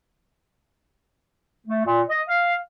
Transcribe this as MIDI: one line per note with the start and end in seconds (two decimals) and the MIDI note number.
1.67 1.82 57
1.85 2.02 46
2.09 2.22 75
2.28 2.54 77